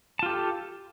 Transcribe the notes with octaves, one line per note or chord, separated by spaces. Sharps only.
F4 G4 A4 A5